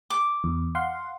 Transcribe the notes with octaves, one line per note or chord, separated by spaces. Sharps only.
D6
E2
F5 F#5 C6